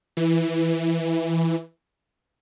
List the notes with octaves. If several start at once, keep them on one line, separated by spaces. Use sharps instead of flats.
E3